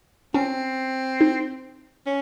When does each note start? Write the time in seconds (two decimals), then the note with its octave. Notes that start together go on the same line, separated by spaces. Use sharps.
0.34 C4 C#4
1.21 D#4
2.06 C#4